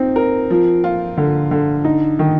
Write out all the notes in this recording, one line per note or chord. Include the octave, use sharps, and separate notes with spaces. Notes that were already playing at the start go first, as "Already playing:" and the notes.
Already playing: C4 D#4
A#4
F3
F4
D3
D3
D#4
D#3